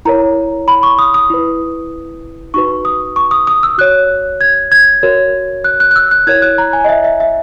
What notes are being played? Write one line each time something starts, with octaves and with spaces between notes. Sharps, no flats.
E4 A#4 C#5 A#5
B5
C#6
D#6
D#6
E4 B4
D#4 F#4 B4 C#6
D#6
C#6
D#6
D#6
E6
F#4 C#5 F#6
G#6
G#6
F#4 A#4 C#5
F#6
F#6
F#6
E6
F#6
E4 A#4 C#5 G#6
F#6
A#5
G#5
D#5
E5
E5
E5